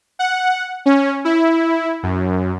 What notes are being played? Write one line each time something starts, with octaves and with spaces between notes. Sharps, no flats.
F#5
C#4
E4
F#2